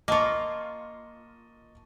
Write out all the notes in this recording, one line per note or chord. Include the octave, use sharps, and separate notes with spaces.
A#3 F4 D#5 A5 C#6